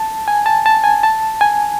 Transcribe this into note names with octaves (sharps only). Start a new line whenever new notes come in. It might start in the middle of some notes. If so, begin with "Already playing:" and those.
Already playing: A5
G#5
A5
A5
G#5
A5
G#5